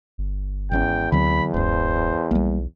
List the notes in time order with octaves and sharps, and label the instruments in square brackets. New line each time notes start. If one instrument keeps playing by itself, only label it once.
[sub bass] G1
[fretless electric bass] G#1 D#3 C#4 [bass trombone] E2 [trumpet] G5
[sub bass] D2 [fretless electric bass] D3 F#3 C4 [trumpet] B5
[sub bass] D1 [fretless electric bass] C#2 F#2 [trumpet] C5
[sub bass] B1 [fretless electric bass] G3 A#3